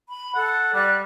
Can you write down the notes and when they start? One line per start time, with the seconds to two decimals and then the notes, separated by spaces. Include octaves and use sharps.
0.09 B5
0.34 A4 F#5
0.74 G3 D5 F#6